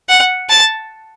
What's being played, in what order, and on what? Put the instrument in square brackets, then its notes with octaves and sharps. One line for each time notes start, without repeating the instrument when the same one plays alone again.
[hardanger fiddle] F#5
A5